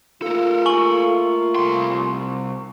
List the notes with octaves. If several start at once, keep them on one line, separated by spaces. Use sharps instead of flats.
A3 A#3 F4 A4 A#4
G#5 C#6 F#7
C2 C6